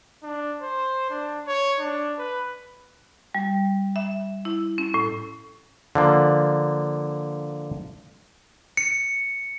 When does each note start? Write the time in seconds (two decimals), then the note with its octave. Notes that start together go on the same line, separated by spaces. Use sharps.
0.23 D4
0.61 C5
1.10 D4
1.47 C#5
1.80 D4
2.18 B4
3.35 G3
3.96 E5
4.45 E4
4.78 C#4
4.94 A2
5.95 D3 F3 A#3
8.77 C#7